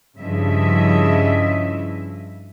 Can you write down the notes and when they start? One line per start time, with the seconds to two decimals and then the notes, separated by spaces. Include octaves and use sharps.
0.18 G2 C#3 F3 E4 D#5 E5